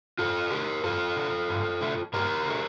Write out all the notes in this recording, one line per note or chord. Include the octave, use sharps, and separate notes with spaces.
G2 F4 A4
D3 A3 G4 A#4
G2 F4 A4
D3 A3
G2
D3 A3
G2 G4 A#4
D3 A3